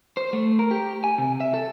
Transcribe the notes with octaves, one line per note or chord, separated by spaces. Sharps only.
C5
A3
A#4
G4
G#5
C3
E5
A4